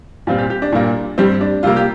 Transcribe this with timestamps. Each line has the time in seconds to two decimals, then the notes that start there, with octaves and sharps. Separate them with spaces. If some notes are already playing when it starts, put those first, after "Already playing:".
0.27 A#2 G3 C4 F4
0.38 G4
0.50 G4
0.62 D4
0.72 A#2 G3 A#3
1.18 G2 G3 C4 G4
1.41 D4
1.63 C3 G3 A#3 F4
1.76 G4